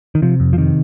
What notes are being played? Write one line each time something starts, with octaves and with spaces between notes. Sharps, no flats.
D#3
C3 F3
F2
F3
C3 D#3